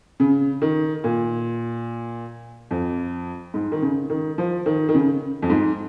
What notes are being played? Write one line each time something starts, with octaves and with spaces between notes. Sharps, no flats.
C#3
D#3
A#2
F2
G#2
D#3
C#3
D#3
F3
D#3
D#3
C#3
F2
G#2